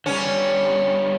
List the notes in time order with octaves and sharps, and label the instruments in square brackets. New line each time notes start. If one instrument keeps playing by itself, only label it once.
[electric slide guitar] D3 G3 [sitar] C#4